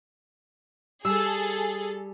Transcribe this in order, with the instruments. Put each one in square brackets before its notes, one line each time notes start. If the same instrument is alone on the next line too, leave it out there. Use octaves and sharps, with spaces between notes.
[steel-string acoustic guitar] G3 [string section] G#4 A4 [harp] E6